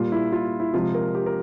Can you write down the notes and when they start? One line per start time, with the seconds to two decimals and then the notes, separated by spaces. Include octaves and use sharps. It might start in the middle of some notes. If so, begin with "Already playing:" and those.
Already playing: A#2 G3 F4
0.12 E4
0.32 F4
0.60 E4
0.74 C3 F3 G#3 F4
0.94 A#4
1.15 G4
1.26 A#4